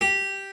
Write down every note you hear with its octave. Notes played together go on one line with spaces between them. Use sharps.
G4